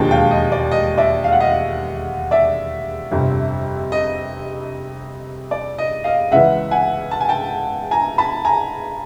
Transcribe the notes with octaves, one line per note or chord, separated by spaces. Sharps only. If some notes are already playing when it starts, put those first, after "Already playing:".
Already playing: E1 D#2 D3 F3 G#3 G5 A5
F5 G5
D#5
D5
D#5
D5 E5
F5
F#5
D#5 F5
D5 E5
G1 F2 C3
D#5
D5
D#5
D#5 F5
C#2 C#3 E3 G#3 E5 F#5
F#5 G#5
A5
G#5
G5 A5
G#5 A#5
A5 B5
G#5 A#5